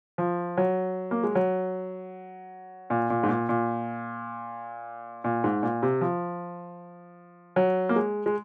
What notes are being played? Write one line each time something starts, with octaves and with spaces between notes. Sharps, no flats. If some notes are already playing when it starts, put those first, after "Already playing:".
F3
F#3
A#3
G#3
F#3
A#2
A#2
G#2
A#2
A#2
A#2
G#2
A#2
C3
F3
F#3
A#3
G#3
G#3